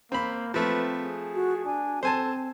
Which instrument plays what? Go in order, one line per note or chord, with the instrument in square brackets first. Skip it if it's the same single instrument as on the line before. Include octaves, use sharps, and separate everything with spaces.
[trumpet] A#3 [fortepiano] C4 B5
[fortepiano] F3 A3 [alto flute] C4 [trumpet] B4
[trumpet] G#4
[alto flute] F#4
[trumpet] D4 [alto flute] G#5
[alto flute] C4 [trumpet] A4 [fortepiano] C5 G#5 A5